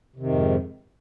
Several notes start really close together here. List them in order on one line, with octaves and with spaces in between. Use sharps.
C3 D#3 F2 G#2